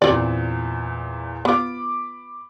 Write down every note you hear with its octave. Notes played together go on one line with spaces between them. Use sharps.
E2 A#2 C4 D5
B3 F4 B5 D6